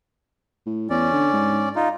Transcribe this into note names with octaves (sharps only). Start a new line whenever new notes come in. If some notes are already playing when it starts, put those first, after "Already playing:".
A2
E2 C#4 D5
D3
G#2
D#4 F4